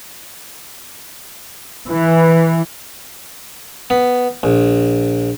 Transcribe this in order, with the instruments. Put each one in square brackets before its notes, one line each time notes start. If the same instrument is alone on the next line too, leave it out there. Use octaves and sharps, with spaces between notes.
[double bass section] E3
[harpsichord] B3
A#1